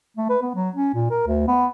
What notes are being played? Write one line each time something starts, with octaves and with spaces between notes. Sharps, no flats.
A3
B4
B3
F#3
C#4
A#2
A#4
D2
B3